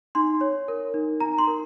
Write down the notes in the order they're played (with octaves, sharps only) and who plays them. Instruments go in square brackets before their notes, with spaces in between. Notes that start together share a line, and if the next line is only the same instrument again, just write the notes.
[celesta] D#4 C6
C#5
A#4
D#4
D#4 A#5
C6
A#4